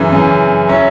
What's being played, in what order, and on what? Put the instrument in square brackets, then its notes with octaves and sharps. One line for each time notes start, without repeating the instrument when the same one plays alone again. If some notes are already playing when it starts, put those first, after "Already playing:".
Already playing: [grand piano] F#2 C#3 E3
F#2 C#3 E3
F#3 C#4 E4